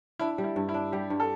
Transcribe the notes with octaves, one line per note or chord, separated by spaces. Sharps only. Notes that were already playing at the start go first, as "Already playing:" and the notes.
D4 E4
G3
E4
G2
E4
D4
G3 G4
G2
A4